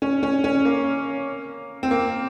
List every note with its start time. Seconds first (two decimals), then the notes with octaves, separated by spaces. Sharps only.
0.02 C#4
0.23 C#4
0.44 C#4
0.65 A#3
1.83 C4
1.91 A#3